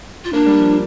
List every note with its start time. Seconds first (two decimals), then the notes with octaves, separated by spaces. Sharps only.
0.24 F4
0.33 A#3 D4
0.46 G3
0.59 F3